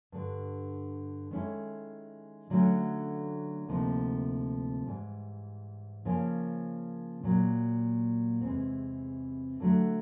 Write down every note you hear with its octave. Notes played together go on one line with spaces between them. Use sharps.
G2 D3 G3
D#3 G#3 C#4 E4 A4
D3 F#3 A3 C#4
D2 C3 F3 A#3 D#4
G#2 E3 G3
C#3 F3 A#3 C#4
A#2 F#3 A#3
E2 C3 E3 G#3 C4
D3 F#3 A3